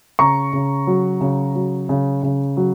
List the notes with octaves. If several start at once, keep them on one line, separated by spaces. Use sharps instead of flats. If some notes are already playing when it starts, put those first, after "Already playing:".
C#3 A#5 C#6
C#3
F#3
C#3
F#3
C#3
C#3
F#3